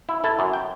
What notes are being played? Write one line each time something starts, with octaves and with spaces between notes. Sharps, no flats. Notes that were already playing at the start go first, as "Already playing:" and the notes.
E4
E4 A4
F#2
G5